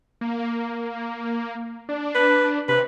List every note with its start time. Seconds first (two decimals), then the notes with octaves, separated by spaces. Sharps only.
0.21 A#3
1.89 D4
2.15 B4
2.69 C3 B4